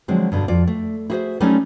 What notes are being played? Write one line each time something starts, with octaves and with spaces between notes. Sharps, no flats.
D3 F3 F#3 G#3 C4
G2 B2 D3
F2 F4 D5
A3
E4 F#4 G#4 A#4 C5 E5
F#3 G3 A3 C4 C#4 D#4